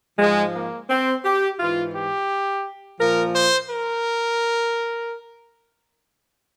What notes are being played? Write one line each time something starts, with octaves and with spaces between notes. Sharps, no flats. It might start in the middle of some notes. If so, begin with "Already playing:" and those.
G#2 F3 G#3
A#3
C4
G4
G#2 E3 F4
G4
A#2 F3 A#4
C5
A#4